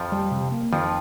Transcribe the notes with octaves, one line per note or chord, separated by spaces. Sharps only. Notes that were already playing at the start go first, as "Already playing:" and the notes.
Already playing: F2 F3
G3
C3
A#3
F2 D#3 F3